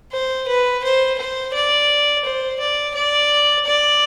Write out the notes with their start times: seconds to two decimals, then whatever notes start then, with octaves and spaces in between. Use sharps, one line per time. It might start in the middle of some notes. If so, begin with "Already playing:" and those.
0.12 C5
0.48 B4
0.84 C5
1.18 C5
1.54 D5
2.25 C5
2.59 D5
2.95 D5
3.66 D5